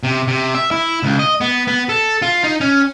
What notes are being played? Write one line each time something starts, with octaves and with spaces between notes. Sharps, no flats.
C3
C3
E5
E4
C#2
D#5
B3
B3
A4
F4
D#4
C#4